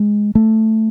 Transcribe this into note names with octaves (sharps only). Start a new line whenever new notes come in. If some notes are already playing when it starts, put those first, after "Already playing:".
Already playing: G#3
A3